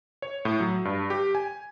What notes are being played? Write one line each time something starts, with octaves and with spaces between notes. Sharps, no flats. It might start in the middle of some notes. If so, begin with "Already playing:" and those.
C#5
A2
F#3
G2
G4
G#5